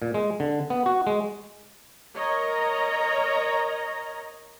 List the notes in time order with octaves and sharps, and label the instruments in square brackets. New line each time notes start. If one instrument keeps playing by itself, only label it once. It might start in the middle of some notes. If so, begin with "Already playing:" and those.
[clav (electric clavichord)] A#2
G#3
D3
B3
F#4
G#3
[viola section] A#4 C#5 D#5 A#5